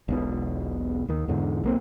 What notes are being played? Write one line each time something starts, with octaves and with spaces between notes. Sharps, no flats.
E1 B1 B2
D#2 D#3
E2 G#2 D3
B1 A#3 C4